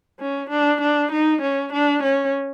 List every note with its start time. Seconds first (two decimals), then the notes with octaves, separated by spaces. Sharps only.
0.20 C#4
0.50 D4
0.81 D4
1.12 D#4
1.42 C#4
1.73 D4
2.03 C#4